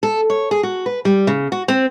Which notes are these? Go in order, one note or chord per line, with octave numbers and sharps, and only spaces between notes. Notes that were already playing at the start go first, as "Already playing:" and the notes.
A4
C#5
G#4
F#4
B4
G3
C#3
F#4
C4